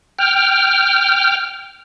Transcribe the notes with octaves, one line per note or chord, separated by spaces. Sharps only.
G5 F6